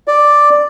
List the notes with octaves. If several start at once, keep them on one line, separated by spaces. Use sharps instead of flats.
D5